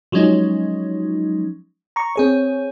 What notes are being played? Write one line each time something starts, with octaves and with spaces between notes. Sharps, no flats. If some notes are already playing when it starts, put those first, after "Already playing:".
F3 F#3 G#3 C#4 D#4
A#5 C#6
C4 G#4 C#5